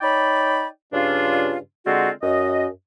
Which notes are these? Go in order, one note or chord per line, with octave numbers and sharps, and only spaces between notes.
D#4 C#5 D5 G5 B5
G2 C#3 D4 F4
D3 G#3 C4 F4 F#4
F#2 D#5